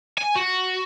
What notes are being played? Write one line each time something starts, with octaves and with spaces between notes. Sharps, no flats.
G#5
F#4